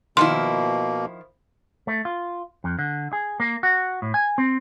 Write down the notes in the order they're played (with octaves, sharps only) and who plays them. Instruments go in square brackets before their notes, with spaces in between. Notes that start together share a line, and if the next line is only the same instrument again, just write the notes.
[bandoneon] B2 A#3 [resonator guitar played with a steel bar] D#3 F3 E4 [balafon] C6
[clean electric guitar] A3
F4
F2
D3
G#4
A#3
F#4
A2
G#5
C4